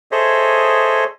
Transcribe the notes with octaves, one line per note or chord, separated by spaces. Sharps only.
G#4 A4 C5 C#5 D#5 E5